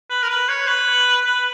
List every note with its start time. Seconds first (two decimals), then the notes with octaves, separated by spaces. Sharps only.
0.10 B4
0.23 A#4
0.29 B4
0.49 C#5
0.68 B4
1.26 B4